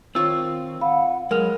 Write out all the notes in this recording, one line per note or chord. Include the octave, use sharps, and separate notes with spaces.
D#3 C4 F4 C#5 E6
F5 F#5 B5
F#3 G#3 A#4 F6 F7